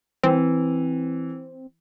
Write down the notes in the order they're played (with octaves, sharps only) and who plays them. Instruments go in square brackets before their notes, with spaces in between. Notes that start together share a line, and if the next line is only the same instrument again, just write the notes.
[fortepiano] E3 [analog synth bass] C4